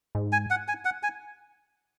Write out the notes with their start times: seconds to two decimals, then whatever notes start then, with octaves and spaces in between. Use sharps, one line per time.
0.15 G#2
0.32 G#5
0.50 F#5
0.68 G#5
0.85 F#5
1.03 G#5